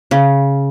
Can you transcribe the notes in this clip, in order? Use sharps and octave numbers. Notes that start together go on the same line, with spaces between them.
C#3